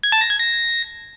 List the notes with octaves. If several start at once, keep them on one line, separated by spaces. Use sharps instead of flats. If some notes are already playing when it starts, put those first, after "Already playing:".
G#6
A5
A#6
G#6
A#6